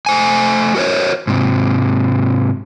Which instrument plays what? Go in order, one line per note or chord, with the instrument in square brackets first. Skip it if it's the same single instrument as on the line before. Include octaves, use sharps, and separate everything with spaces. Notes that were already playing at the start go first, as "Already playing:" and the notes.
[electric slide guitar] A3 C5 G#5
F#4 A#4 C5 C#5
G#2 C3